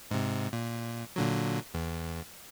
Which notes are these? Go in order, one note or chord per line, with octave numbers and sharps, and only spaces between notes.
G#2 C3
A#2
A#2 D3 F#3
E2